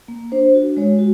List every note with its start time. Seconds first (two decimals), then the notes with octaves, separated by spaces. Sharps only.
0.08 A#3
0.32 D4 C5
0.54 F#4
0.77 G#3 C#5
0.99 F#4